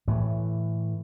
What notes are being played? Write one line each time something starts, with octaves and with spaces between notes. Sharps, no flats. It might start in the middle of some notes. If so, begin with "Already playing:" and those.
A2 E3 A3